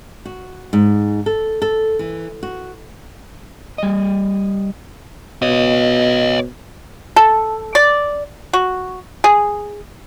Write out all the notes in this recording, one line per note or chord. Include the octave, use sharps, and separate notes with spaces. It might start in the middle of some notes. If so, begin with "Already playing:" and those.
F#4
G#2
A4
A4
E3
F#4
G3 D#5
B2 C#5 D#5
A4
D5
F#4
G#4